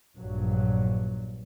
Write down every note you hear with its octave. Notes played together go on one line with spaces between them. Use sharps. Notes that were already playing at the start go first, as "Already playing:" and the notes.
A#1 G2 F#3